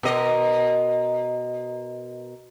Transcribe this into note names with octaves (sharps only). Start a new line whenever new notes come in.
B2 A#4 D#5